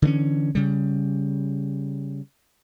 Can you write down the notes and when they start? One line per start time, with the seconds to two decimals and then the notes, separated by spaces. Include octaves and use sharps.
0.02 D3 E3 G3 C#4
0.55 C#3 G3